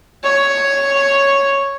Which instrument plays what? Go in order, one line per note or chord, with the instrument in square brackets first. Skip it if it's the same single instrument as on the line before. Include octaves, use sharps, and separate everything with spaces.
[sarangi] C#5